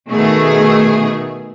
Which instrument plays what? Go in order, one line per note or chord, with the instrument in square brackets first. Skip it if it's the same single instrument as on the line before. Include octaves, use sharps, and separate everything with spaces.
[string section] B2 D#3 A3 G#4